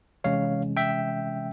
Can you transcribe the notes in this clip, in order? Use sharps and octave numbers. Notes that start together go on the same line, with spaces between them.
C3 E3 G#3 C#4 C#5 F5
E5 G5